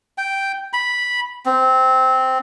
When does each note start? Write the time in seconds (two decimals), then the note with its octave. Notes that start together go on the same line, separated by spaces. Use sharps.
0.18 G5
0.73 B5
1.46 C4